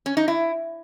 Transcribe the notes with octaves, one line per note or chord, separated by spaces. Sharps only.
C#4
D#4
E4